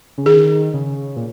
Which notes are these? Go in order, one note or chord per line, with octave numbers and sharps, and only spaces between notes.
C#3
D#3 G#4
C#3
A#2